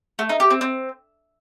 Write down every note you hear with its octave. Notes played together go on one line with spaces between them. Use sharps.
A3
D#4
G4
C4
C4